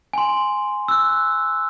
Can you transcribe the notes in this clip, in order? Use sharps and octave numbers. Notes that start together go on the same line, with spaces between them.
G#5 C6
E6 F#6